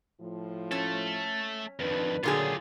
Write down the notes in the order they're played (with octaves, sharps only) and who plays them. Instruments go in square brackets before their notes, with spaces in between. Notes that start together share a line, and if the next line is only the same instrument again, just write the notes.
[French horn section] A2 F3
[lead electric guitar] A3 A4 [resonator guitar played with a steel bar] C#4
[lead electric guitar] F2 D#3 [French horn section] D4 D#4 B4
[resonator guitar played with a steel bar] A#2 D3 G#4 [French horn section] F#3 [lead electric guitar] F4 G4